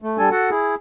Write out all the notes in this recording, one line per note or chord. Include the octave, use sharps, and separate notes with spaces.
A3
G3 D4 A4 G#5
F#4 A4 F#5
E4 G#4